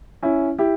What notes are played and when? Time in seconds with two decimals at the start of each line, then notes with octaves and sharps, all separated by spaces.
0.23 C#4 E4
0.58 E4 G4